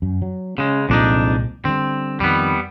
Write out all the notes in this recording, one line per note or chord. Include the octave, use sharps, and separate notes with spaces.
F#2
F#3
C#3 G#3 C#4
C2 F2 A#2 G#3 D4 D#4
D3 G3 C4
F2 D#3 G3 B3